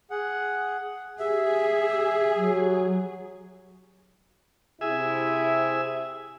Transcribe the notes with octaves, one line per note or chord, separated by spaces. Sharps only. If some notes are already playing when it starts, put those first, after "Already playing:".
G#4 F#5
G4 G#4 E5
F#3
C3 E4 G#4 E5